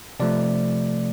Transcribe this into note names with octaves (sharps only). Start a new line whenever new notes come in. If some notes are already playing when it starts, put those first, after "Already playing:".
C3 F3 A3 D5